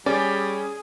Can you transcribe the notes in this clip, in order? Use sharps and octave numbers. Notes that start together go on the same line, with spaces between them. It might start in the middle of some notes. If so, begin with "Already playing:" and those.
G3 C#4 G#4 D5